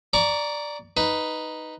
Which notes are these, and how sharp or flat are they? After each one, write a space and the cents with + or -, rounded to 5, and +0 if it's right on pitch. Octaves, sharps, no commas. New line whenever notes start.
D5 +0 A#5 +0 C#6 +35
D#4 +0 B4 +0